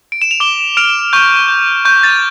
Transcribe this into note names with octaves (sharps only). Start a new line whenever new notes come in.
D7
E7
F7
D6 E7 G7
F6 D7 F7
C#6 G6
G6
C#6 G6
A6